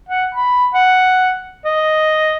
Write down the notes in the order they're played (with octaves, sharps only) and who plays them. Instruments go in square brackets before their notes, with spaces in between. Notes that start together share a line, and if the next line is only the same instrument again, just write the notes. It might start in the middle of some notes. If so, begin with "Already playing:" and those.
[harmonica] F#5
B5
F#5
D#5